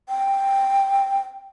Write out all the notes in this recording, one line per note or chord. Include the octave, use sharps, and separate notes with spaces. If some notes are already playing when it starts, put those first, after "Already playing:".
G5